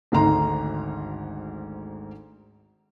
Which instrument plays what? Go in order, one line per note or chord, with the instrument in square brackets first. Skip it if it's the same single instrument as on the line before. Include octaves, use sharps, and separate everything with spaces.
[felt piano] G#1 D2 G#2 D#4 A#5 C6